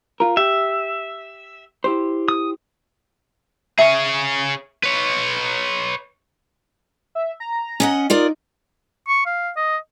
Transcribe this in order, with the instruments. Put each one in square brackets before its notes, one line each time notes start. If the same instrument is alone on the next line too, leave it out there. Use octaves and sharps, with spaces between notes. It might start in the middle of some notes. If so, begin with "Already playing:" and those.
[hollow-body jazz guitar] F4 A#4
[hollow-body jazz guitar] G4 [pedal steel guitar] E5
[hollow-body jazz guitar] E4 G4 C5
[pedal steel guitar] D#6
[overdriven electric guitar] G#4 C#5 [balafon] E5
[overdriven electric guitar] B4 C#5
[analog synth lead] E5
A#5
[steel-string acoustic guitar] C#4 D#5 F#5
[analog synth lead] D#4 [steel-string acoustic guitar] F4 A#4 D5
[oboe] C#6
F5
D#5